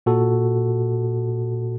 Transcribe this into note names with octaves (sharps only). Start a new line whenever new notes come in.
A#2 F#4 A4